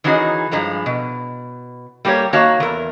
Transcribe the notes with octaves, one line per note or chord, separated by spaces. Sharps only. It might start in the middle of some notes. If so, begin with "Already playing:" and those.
D#3 E3 C#4 D#4 F#4 G#4
G2 F3 G#3 A#5
B2
G3 A#3 G4 A#4 C#5
D#3 A#3 F#4 C#5 F5 A5
E2 A#4